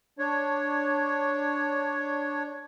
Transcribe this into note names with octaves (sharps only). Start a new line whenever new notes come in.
D4 C#5